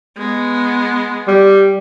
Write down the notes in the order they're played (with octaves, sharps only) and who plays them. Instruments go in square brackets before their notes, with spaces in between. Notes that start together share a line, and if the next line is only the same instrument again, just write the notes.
[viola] G#3 B3
[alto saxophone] G3